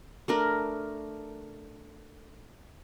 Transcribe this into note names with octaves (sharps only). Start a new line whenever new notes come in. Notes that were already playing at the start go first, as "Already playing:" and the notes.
A3 D4 A#4